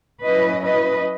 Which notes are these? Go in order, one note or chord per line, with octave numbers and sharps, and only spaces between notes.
F#3 C#4 E4 B4 D#5
B4 D#5